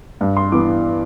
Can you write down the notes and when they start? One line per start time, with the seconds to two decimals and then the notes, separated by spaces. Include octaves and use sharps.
0.21 G2
0.37 C6
0.52 E3 B3 D6